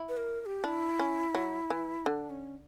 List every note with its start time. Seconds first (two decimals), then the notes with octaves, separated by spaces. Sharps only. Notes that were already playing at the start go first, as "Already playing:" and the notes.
Already playing: E4
0.09 B4
0.17 A#4
0.41 A#4
0.46 G4
0.64 D4 E4
0.99 C#4
1.35 F#3
1.70 E3
2.05 D3 D4
2.30 C#4